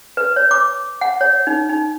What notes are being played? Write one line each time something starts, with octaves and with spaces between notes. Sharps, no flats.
B4
C#5
D6
F#5
C#5
D#4
D#4